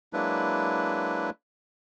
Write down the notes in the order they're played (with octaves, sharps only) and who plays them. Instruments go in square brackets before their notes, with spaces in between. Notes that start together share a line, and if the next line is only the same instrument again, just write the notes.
[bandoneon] F#3 G#3 A#3 D4 E4 B4